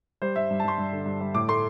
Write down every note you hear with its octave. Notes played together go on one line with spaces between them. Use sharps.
G3 C5
G2 E5
G2
A5
G2 C6
G2
D3
G2
G3
A2 D6
A3 C6